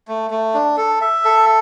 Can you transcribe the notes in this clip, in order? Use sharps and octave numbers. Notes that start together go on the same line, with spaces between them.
A3
A3
D4
A4
E5
A4